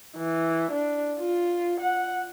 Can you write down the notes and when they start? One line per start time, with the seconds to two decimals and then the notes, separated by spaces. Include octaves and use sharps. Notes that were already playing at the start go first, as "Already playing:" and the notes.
0.17 E3
0.72 D4
1.19 F4
1.80 F#5